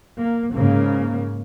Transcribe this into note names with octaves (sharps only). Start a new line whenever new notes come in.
A#3
G#2 C#3 A#3